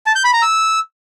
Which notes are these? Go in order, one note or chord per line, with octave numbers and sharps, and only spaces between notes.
A5
G6
B5
A#5
E6